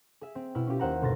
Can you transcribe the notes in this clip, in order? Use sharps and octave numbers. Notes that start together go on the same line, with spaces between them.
G#4 E5
C4
B2 E4 F6
C#4 F4 G4
D#2 C5 E5 F#5 G5 A#5
G1 B2 C6 A6 A#6